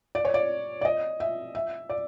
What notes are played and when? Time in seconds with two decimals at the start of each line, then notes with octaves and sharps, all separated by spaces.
0.15 D5
0.25 C#5
0.34 D5
0.81 D5
0.85 D#5
1.20 E5
1.55 E5
1.90 D5